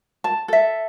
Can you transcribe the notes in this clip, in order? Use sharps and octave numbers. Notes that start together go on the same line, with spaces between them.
A5
A4 E5